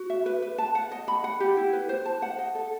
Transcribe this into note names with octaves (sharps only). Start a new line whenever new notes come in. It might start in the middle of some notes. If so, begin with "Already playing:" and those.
Already playing: F#4
E5
B4
B4
A5
F#5
D#5
B5
F#5
G4
E4
B4
C5
A5
F#5
D#5
A4